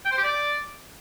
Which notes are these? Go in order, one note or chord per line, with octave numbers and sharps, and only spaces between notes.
G5
C5
G4
D5